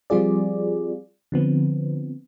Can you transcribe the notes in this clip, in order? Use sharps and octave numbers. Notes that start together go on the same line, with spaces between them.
F3 G3 C4 F4 G#4 D5
D3 F3 B3 C4